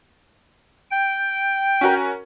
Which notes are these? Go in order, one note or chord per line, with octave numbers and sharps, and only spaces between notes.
G5
C#4 F#4 A#4